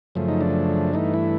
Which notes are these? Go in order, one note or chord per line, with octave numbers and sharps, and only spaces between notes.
F#2 C#3 F3 A3
D#4
D4
G2 E3 A3 D#4
E4